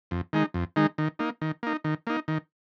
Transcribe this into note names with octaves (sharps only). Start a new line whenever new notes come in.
F2
D#3 G#3 D#4
F2
D#3 G#3 D#4
D#3
A#3 D#4
D#3
A#3 D#4
D#3
A#3 D#4
D#3